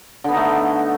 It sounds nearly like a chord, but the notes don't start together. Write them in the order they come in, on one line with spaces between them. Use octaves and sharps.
D3 B3 D#4 A3